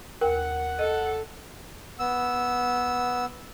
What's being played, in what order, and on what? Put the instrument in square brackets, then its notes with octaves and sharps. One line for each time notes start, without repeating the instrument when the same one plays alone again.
[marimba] D#2 G5 [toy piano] A#4 [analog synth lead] F#5
[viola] A4 [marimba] D#5
[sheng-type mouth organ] B3 E6